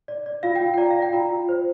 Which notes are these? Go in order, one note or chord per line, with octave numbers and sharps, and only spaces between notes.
D5
D5
F4 F5
G5
F4
G5
D5 A#5
F5
D5
G5
F4 A#5
F4
C5